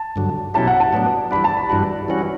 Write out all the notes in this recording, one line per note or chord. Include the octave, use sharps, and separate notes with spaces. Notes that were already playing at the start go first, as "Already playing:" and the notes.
Already playing: A5
G2 D3 F#3
B2 F#3 C#4 E4 G4 A5
F#5
A5
A2 F#3 B3 D4
E3 G3 D4 B5
A5
B5
G2 E3 G3 D4 F#4
E3 G3 C#4 F#4